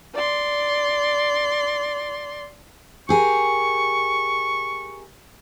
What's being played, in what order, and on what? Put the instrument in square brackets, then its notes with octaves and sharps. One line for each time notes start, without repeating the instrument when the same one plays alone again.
[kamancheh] D5 C6
[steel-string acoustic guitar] G4 G#4 A#4 [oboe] C#6